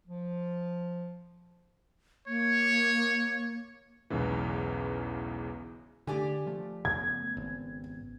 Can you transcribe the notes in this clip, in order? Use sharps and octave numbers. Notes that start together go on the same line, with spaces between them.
F3
A#3 C#5
B1 E2 G#2 C#3 E3
D3 A3 G4 D5 G#5
F3 A3
C#3 B3 G#6
G#1